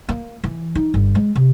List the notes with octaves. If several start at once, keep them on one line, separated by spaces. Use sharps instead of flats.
A#3
E3
D#4
G1
G#3
C3